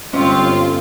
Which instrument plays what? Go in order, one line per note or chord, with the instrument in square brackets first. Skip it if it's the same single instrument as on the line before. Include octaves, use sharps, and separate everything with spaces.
[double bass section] G1 [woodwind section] C4 [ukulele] C#4 [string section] F4